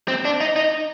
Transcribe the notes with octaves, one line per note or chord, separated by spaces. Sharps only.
C4
D4
D#4
D#4